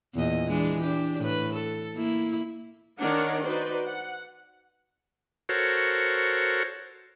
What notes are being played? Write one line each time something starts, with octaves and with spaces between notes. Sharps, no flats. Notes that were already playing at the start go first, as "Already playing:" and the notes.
E2 A#2 D#5
E3 G#3 D4
D4 G4
A2 B4
A4
A#3 E4
D#3 D4 D#4 A#4 C#5 F#5
D#4 F#4 B4 C5 D5
F#5
F#4 A4 A#4 C5 C#5